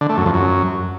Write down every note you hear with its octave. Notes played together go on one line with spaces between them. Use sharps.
D3
A3
F#2
F2
F#2